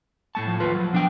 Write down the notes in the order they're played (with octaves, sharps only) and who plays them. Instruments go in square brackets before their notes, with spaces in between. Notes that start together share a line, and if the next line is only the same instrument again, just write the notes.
[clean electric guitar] A2 A3 A5 [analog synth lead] C#6
[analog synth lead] F3
[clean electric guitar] D#2 F4 B4
F#3
B2 D4 G5